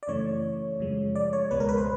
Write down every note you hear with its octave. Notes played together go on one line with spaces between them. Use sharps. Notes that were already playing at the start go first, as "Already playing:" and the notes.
D5
F#2 C#3 E3 A3 C#5
F#2 C#3 F3 G#3
D5
C#5
C#2 B2 G#3 B3 B4
A#4
B4
C5